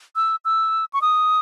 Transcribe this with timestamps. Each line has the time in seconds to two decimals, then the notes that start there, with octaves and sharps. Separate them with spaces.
0.16 E6
0.45 E6
0.93 C#6
1.02 D#6